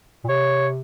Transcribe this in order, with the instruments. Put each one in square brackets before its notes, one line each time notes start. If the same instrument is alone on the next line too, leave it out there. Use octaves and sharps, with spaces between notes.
[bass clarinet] A#2
[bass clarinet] C3 [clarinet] C#5